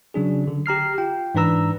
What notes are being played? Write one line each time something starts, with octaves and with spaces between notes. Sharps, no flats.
C#3 F#3 D4 G#4
D3
G4 A#5 F6 C7
F4 G5
G#2 E3 D4 B4 A#5 E6